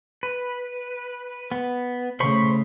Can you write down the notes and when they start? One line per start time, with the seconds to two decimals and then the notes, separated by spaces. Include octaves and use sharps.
0.23 B4
1.52 B3
2.20 C#3 A3 C5 B5 C#6